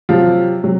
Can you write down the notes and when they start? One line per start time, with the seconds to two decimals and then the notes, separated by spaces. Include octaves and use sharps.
0.09 C3 F3 F#3 F4
0.64 C3 F#3